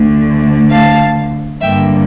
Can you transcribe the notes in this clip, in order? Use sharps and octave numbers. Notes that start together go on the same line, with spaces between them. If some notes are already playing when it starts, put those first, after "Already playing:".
Already playing: D2 D3 A3
F5 A5
G2 D3 G3 A#3 E5 G5